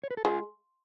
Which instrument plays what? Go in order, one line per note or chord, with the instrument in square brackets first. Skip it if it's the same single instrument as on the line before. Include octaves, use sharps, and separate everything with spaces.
[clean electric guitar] C#5
B4
A4
[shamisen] G#3 [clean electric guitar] F4 G#4